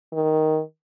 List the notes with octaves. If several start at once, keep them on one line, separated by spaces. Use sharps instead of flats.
D#3